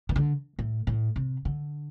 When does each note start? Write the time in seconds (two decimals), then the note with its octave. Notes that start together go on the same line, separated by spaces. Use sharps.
0.09 E3
0.16 D3
0.59 A2
0.87 A2
1.16 C3
1.45 D3